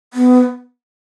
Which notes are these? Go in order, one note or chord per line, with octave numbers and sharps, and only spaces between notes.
B3